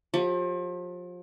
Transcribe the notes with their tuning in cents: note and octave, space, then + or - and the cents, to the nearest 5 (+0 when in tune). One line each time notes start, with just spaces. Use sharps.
F3 +35 G4 +25